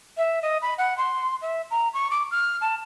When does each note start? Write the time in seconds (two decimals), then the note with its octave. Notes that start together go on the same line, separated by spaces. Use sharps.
0.18 E5
0.42 D#5
0.62 B5
0.78 F#5
0.98 C6
1.42 E5
1.71 A#5
1.94 C#6
2.11 D6
2.31 F6
2.61 A5